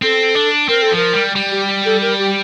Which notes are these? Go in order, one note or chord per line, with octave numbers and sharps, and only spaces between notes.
C4 A4
D4
C4 A#4
A4
F3 A#4
G3
G3
G4
A4
A#4
G4